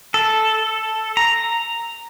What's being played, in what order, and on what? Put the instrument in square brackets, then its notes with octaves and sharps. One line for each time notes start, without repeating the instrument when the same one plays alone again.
[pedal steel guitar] A4
A#5